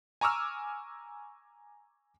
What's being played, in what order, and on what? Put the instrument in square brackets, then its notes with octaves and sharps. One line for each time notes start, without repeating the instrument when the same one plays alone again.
[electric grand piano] G#5 A#5 C#6 D6 E6 F6